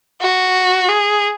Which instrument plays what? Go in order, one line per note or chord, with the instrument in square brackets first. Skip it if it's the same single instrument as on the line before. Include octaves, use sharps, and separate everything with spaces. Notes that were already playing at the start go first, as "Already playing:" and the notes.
[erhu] F#4
G#4